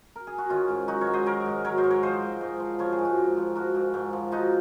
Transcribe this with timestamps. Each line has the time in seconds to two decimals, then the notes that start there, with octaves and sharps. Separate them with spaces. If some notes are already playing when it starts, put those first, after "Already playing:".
0.16 A#4
0.27 G#4
0.38 F#4
0.50 D#3 C#4 F4
0.69 G#2
0.88 F#3 D#4 F#4
1.01 A#4 C#5
1.07 G#2
1.13 C5 D#5
1.26 D#3 A#4 C#5
1.46 G#2
1.65 F#3 A#4 C#5
1.78 C5 D#5
1.83 G#2
1.90 A#4 C#5
2.03 F3 C5 D#5
2.22 G#2
2.41 G#2
2.60 F3
2.79 F3 A#4 C#5
2.92 G#4 C5
2.99 G#2
3.05 F#4 A#4
3.17 G#2
3.37 F3
3.55 F3 F#4 A#4
3.75 G#2
3.94 G#2
4.13 F3
4.32 F3 D#4 F#4